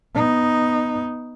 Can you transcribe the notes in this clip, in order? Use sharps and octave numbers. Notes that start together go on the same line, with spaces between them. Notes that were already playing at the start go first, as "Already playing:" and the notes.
B3 D#4